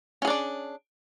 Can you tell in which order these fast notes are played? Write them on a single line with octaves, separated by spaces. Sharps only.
C#4 G#4 D4 D5